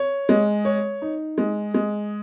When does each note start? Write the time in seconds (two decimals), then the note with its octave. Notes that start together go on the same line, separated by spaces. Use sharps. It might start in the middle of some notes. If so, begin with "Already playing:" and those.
Already playing: C#5
0.29 G#3
0.65 C#5
1.02 D#4
1.38 G#3
1.74 G#3